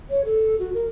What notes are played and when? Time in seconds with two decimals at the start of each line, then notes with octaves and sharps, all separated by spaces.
0.10 C#5
0.25 A4
0.59 F#4
0.74 A#4